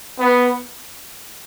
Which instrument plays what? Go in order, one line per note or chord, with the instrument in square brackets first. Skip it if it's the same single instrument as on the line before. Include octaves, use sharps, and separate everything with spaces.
[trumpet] B3